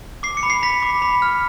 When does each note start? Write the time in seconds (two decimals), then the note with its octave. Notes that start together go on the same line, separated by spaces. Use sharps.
0.23 D6 C7
0.37 C#7
0.43 B5
0.50 C7
0.63 B5 B6
0.83 D6
1.02 B5
1.22 F6